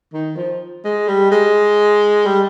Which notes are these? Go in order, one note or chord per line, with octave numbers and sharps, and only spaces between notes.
D#3
F3
G#3
G3
G#3
G3